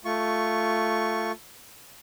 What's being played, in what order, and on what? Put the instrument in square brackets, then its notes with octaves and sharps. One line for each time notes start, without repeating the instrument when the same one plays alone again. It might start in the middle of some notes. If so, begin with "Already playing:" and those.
[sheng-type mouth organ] A3 F4 C#6